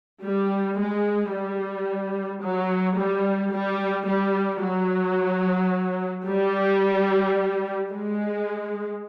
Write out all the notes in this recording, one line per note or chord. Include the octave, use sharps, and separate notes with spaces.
G3
G#3
G3
F#3
G3
G3
G3
F#3
G3
G#3